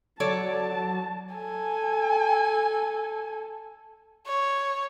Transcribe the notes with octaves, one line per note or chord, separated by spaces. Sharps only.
F#3 A4 C#5 D5 A5
A4 G#5
C#5